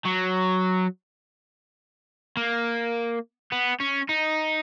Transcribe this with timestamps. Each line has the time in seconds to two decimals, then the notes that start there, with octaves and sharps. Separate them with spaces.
0.05 F#3
2.37 A#3
3.52 B3
3.80 C#4
4.09 D#4